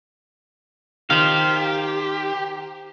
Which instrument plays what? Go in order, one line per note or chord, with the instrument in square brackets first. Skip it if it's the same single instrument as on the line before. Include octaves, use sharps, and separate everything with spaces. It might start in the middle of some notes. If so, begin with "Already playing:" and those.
[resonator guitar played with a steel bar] D#3 [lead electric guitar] G4 [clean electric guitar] C5 F5